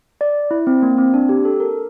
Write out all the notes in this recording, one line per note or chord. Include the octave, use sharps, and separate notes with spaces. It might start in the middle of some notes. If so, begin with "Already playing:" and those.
D5
E4
C4
A#3
C4
D4
G4
A4
A#4